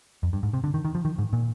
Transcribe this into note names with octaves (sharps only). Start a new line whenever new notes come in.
F2
G2
G#2
C3
D3
D#3
D#3
F3
D#3
G#2
A#2